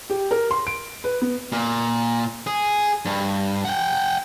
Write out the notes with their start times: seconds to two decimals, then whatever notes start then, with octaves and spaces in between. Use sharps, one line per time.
0.10 G4
0.31 A#4
0.51 C6
0.67 D7
1.04 B4
1.22 B3
1.52 A#2
2.47 G#4
3.05 G2
3.65 F#5 G5